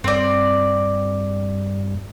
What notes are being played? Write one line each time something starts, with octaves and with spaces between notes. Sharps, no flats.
G2 C4 D5